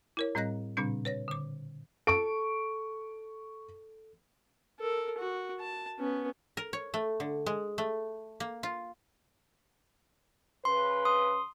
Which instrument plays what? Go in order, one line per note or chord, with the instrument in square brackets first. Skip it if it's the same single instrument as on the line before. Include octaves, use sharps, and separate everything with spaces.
[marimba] E4 A#4 C#5
A2 G3 C4 D#5 F#6 A#6
A#2 C#3 G3 C4 D4
B4 C#5 A#6
D3 D6
[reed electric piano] A4 [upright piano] C#6 D7
[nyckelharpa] A4 A#4
F#4
A5
B3 C#4
[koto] A#4
C#5
A3
D3
G#3
A3
A#3
F4
[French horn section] C#3 B4 [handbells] C6
[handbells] C6 D#6